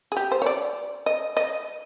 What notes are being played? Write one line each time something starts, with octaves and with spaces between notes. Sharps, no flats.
G#4
G4
C5
C#5
D5
D#5
D#5